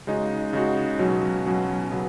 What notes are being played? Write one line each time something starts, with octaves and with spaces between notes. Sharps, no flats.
C#3 G#3 D#4 F#4
C#3 G#3 D#4 F#4
B2 F#3 C#4 F#4
B2 F#3 C#4 F#4
C#3 F#3 B3